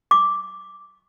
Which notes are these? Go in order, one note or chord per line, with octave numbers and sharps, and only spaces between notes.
D6